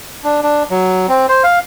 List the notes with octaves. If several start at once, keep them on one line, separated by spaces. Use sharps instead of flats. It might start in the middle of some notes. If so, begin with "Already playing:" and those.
D4
D4
F#3
C4
C5
F5